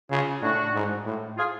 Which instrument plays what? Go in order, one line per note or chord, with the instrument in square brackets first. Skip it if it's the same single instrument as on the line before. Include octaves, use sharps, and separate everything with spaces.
[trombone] C#3 [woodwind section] F4 G#4
[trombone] A2 [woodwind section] D4 F#4
[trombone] G#2
A2
[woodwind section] F4 G#4